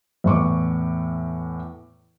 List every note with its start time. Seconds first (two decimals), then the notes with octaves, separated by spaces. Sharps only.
0.24 E2 A2 C#6 D6